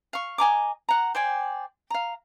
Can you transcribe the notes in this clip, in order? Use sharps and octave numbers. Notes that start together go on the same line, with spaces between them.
F5 C#6
D#5 G#5 A#5 D6
F#5 A#5
C5 D5 G5 G#5
F5 A#5